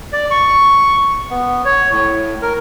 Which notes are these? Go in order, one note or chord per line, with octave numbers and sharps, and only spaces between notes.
D5
C#6
B3
C#5
A2
A#4